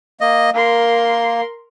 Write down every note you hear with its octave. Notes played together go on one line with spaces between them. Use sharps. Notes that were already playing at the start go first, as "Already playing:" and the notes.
A#3 D#5
A#3 A#4 C6